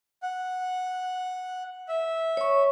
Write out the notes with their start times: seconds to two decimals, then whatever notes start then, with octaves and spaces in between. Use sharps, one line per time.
0.22 F#5
1.88 E5
2.37 C#5 C#6